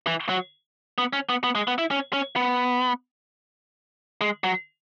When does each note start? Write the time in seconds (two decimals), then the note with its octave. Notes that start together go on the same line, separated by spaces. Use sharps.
0.07 E3
0.29 F#3
0.98 B3
1.13 C#4
1.29 B3
1.44 B3
1.55 G#3
1.68 B3
1.78 E4
1.91 C#4
2.13 C#4
2.36 B3
4.21 G#3
4.44 F#3